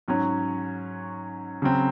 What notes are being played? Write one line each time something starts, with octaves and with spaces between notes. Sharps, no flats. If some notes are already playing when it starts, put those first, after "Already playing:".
G#2 F#3 C#4
C#3 F#3 C4